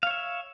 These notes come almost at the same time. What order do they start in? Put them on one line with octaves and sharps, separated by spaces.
F5 C#5 E5